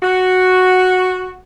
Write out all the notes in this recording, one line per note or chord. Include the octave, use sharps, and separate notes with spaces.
F#4